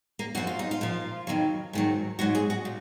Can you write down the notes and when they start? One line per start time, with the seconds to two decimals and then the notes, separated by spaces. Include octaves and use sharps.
0.19 A#3
0.35 F#2 F3 F#4
0.47 F4
0.59 D#4
0.71 F4
0.81 A#2 F3
1.27 F2 D#3 F#3
1.73 G#2 D#3 F#3
2.19 G#2 F#3 F#4
2.35 G#4
2.50 F#4
2.65 A#2